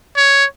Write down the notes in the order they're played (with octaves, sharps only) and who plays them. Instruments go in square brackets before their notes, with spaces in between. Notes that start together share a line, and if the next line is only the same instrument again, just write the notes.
[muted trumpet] C#5